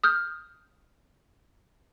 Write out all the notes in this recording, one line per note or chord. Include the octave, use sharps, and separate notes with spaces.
D#6 F6 G6